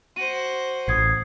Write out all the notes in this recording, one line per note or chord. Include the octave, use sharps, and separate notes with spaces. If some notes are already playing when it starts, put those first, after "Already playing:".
F#4 C5 D#7
A1 D#6 G#6 C7